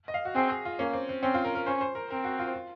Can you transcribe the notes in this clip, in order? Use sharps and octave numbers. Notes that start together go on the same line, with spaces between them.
D#5
F5
F#4
C4 G#4
G#4
F4
A#3 C#4
C4
C4
C4 C#4
F4
A#4
A#4
C#4 C5
C5
A#4
C4 A#4
F#4
F4
F4